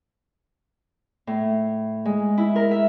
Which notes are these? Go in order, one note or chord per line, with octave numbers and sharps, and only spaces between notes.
A2
G#3
E4
A#4
E5